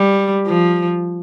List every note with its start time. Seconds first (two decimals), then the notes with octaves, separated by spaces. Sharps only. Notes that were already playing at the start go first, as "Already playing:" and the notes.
Already playing: G3
0.47 F3